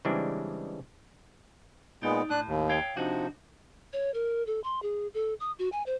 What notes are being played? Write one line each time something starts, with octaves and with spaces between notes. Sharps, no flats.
C#3 E3 G3 G#3 C4 D4
A#2 G#3 B3 D#4 D5
A2 D4 F#6
D#2
C#5 F5 G5
C3 F3 D4 D#4 F#4
C#5
A#4
A4
C6
G#4
A4
D#6
F#4
G#5
C5